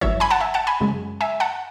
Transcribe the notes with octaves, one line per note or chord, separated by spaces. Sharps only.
G#1 F#2 E3 C#5 E5
G#5 B5
F#5 A5
E5 G#5
F#5 A5
G#5 B5
F#2 C#3 G#3
E5 G#5
F#5 A5